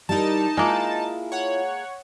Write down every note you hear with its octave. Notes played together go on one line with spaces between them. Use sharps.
G3 D#4 E4 A#4 A5
G#3 A#3 E4 F4
C#5 F#5